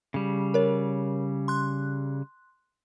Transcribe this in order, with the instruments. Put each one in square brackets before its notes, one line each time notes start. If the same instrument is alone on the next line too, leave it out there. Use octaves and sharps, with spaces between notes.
[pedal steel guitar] C#3 G3
[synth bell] A#4 C#5
C6 F#6